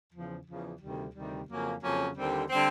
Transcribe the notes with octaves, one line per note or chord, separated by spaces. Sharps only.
E2 C#3 F3
E2 C#3 F3
D2 C3 D#3 G3
D2 C3 D#3 G3
F2 C#3 F#3 A#3 C#4
F2 C#3 F#3 A#3 C#4
D#2 D3 G3 C4
D3 G3 C4